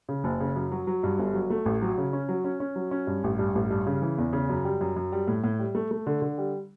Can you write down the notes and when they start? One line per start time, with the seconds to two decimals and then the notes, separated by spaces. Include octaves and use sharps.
0.09 C#3
0.24 F#1
0.40 C#3
0.56 F#2
0.72 F#3
0.87 F#3
1.03 G2
1.19 G1
1.34 F#3
1.50 A3
1.66 A1
1.82 F#3
1.98 C#3
2.13 C#4
2.29 F#3
2.44 C#4
2.60 C#4
2.76 F#3
2.91 C#4
3.07 G2
3.24 A1
3.39 G2
3.55 A1
3.70 G2
3.86 C#3
4.02 E3
4.18 E2
4.33 C#3
4.49 F#2
4.65 G3
4.81 F#2
4.96 F#2
5.12 G3
5.28 A2
5.44 A2
5.59 G3
5.75 A3
5.91 A3
6.07 D3
6.22 D3
6.38 G3